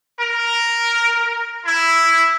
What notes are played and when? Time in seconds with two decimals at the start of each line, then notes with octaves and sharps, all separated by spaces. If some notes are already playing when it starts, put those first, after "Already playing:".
0.19 A#4
1.66 E4